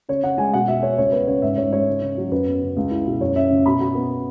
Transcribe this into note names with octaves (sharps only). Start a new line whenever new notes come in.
C#3 C#5
C#3 F#5
G#3 G#5
B2 F#5
B2 E5
B3 C#5
C#2 C#5
B3 B4
C#3 C#5
G#2 E5
G#2 C#5
G#3 C#5
C#3
C#3
F#3
F#2 B4
B3
C#3
C#2
E4
B2
F#2 C#5
C#4 E5
C#3
B2 B5
B2
B3